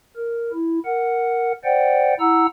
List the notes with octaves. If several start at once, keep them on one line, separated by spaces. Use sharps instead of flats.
A#4
E4
A#4 F#5
C5 D5 F#5 G5
E4 F#5 A#5 E6